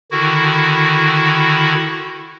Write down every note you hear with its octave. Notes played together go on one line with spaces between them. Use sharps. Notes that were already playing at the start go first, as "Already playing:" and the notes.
D3 D#3 E4 F#4